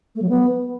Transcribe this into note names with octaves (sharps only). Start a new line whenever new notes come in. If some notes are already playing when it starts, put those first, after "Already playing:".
A3
F#3
B3